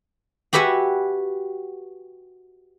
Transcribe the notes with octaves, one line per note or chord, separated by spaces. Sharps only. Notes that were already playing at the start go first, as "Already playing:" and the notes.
F#4 G4 B4 E5 F#5 G#5